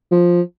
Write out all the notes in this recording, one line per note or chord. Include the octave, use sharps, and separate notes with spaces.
F3